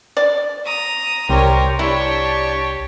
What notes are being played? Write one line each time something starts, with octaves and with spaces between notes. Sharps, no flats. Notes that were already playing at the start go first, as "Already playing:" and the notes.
D5
A#5 D#6
C2 G3 G4 A#4 C5 C#5
D4 E4 G4 C#5 A5 C#6